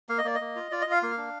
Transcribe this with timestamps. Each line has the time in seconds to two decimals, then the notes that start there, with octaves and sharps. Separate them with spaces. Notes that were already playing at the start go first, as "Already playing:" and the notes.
0.09 A#3 F5
0.18 D#5
0.24 A#3 D5
0.35 D#5
0.40 A#3
0.56 F4
0.71 F4 D5
0.81 D#5
0.87 F4 F5
1.02 A#3 F5
1.17 D4